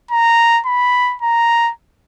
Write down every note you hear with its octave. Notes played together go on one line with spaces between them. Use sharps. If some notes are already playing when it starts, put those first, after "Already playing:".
A#5
B5
A#5